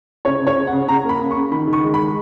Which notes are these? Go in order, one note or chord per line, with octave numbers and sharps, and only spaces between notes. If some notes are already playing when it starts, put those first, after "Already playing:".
C#3 C#5
C#3
C#5
C#3
F#5
C#3
C#3 A#5
A#3 B5
C#3
C#6
C#3
D#3 B5
D#3
C#6
G#3
B5
G#3